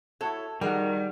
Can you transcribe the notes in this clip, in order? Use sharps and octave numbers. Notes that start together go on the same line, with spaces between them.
E4 F#4 A4 C#5
D#3 G3 F#4 G#4 A#4 G5